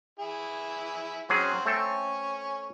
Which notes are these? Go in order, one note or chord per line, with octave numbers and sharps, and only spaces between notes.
E4 G#4
F#3 C4 C#4 G#4 F#5
A3 C4 A4 C#5 G#5